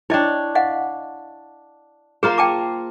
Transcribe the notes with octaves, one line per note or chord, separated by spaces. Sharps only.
D4 E4 C#5 D#5 G5
D#5 F5 F#5
A#3 F4 G#4 C5
G5 A5 D6